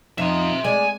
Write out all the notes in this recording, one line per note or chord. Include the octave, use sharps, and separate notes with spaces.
F2 D#4 E5 C6
G#3 D5 G#5